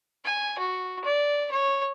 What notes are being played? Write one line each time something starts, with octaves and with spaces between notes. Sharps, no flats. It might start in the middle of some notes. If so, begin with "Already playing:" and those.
G#5
F#4
D5
C#5